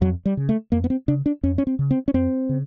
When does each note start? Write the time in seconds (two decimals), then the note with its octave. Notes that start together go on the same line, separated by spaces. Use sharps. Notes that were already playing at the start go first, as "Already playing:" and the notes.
0.01 F2 F#3
0.26 G3
0.37 C#3
0.49 A3
0.72 F2 A#3
0.84 B3
0.90 C4
1.08 C#3 D4
1.26 D4
1.43 F2 C#4
1.58 C#4
1.67 C4
1.79 C#3
1.91 C4
2.08 C#4
2.14 F2 C4
2.49 C#3